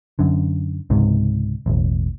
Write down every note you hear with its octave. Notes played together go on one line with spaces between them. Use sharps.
F#2 D3
C#2 G#2 C3
E1 A1